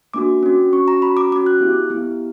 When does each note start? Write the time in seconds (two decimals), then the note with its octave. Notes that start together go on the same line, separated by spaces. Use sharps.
0.14 A#3 D4 F#4 D6
0.43 C#4 F#4
0.73 C#4 F#4 C#6
0.88 A#5
1.02 C#4 B5
1.05 F#4
1.17 D6
1.32 C#4 D6
1.36 F#4
1.46 F#6
1.61 B3 E4 G4
1.90 B3 E4 G4